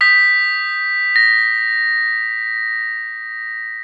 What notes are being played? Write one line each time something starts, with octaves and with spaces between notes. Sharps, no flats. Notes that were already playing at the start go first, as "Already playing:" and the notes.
D#6 G6 B6
A#6